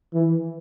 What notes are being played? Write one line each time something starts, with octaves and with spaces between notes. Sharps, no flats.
E3